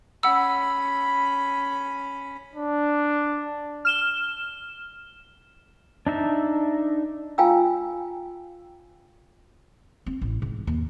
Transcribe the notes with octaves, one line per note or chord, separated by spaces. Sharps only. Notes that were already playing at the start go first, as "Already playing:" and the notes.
C#4 F#5 B5 E6
D4
F6 E7 G7
D4 D#4 E5 A5
F4 F5 G5 G#5 A#5 E6
C4
A1
G#2
D#2